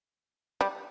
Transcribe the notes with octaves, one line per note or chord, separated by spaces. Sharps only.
G3